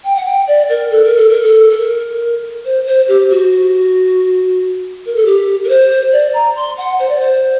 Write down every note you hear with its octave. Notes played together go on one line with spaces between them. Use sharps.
G5
F#5
G5
D5
A#4
A4
A#4
A4
A#4
A4
A4
A#4
C5
C5
G4
F#4
A#4
A4
G4
A#4
C5
D5
A#5
C6
F#5
C5
D5
C5